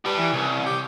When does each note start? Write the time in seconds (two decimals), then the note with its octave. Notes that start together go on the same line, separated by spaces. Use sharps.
0.05 G3 G4 B4
0.18 E3
0.33 C2 C#4
0.66 G4